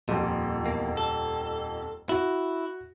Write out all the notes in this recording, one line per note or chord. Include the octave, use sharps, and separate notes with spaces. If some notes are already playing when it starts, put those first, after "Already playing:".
D#1 F2 A#2
E2 A#3
A4
E4 F#4